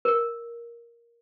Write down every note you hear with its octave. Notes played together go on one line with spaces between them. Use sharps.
A#4